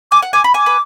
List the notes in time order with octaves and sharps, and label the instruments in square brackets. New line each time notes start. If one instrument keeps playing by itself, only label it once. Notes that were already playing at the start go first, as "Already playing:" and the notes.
[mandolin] G#5 [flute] D6
[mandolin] F#5
[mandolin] G#5 [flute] D6
[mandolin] B5
[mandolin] G#5 [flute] D6
[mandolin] B4